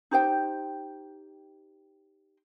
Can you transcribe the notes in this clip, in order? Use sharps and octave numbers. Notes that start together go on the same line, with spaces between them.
D#4 G4 C5 G5